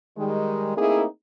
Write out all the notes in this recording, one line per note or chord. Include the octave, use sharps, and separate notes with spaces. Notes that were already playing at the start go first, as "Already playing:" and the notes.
D#3 G3 G#3
A3 A#3 C4 D#4 E4 G#4